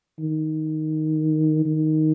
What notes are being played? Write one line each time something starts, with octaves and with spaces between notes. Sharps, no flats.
D#3
D#3